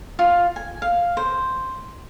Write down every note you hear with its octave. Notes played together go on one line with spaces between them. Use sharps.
F4
G#5
F5
C5